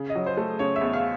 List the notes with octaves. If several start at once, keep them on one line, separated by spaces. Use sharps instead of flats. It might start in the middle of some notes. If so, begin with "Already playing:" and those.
Already playing: C#3
D#5
F#3
C5
A3
C#3 C#5
E5
E2
F5